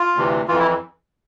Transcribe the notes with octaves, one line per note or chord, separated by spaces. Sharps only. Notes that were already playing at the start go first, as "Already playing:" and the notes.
Already playing: F4
D2 C3 E3
F2 E3 F4
E4